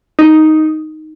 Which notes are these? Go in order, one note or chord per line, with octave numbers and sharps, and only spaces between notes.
D#4